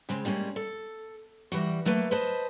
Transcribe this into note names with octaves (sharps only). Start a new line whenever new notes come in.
C#3 G#3 C4
G3 G#3 A#3 C#4
A4
E3 G3 F#4
F#3 A3 A#3 B4
B4 C5 D#5 A5